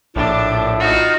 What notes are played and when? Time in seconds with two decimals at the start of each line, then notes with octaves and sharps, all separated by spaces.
0.16 A#1 A2 D4 D6
0.80 D#4 F4 F#4